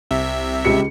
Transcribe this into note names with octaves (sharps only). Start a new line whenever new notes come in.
C2 C3 E5
C#2 G4 C#7